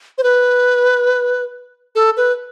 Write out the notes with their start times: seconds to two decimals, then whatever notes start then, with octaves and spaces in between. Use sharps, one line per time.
0.18 C5
0.23 B4
1.95 A4
2.17 B4